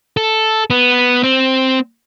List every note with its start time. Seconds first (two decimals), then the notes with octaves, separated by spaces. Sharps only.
0.17 A4
0.70 B3
1.23 C4